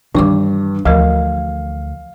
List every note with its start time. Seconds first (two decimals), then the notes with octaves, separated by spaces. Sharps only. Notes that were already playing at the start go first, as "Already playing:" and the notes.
0.15 G2 D#3 E3 D4 C#6 D6
0.85 D2 E3 F3 A#4 F5